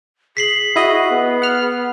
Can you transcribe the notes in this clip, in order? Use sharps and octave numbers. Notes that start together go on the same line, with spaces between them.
G#4 B6 C7 F#7
E4 F#4 D#5
B3
F#5 F6